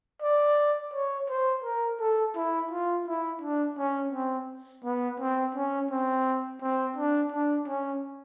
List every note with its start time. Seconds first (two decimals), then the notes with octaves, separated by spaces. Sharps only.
0.22 D5
0.94 C#5
1.29 C5
1.64 A#4
2.00 A4
2.36 E4
2.71 F4
3.07 E4
3.42 D4
3.78 C#4
4.13 C4
4.85 B3
5.20 C4
5.55 C#4
5.91 C4
6.62 C4
6.97 D4
7.32 D4
7.68 C#4